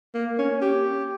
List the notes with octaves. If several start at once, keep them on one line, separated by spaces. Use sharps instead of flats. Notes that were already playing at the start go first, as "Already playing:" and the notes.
A#3
C#4
G4